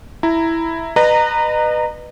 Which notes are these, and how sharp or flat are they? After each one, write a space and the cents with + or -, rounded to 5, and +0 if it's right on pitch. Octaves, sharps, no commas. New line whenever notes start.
E4 +0 A#5 -5
B4 +0 D#5 -35 A#5 -15